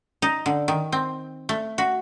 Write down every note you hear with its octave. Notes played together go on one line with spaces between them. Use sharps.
D#4
D3
D#3
C4
A3
F#4